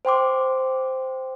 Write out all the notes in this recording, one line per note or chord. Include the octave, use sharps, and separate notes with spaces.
C5 G5 C6 D6